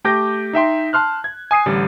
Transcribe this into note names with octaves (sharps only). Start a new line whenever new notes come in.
A3 G4 G5 D6 G6 A#6
D#4 E5 G5 C6
A5 C6 F6 F#6
G#6
G#5 D#6 C7 D#7
A1 D3 G3